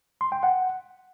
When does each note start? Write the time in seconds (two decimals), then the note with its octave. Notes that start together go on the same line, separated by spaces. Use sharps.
0.21 C6
0.32 G5
0.43 F#5